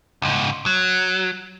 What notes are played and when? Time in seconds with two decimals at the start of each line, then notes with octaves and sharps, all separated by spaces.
0.22 C#2 G#2
0.66 F#3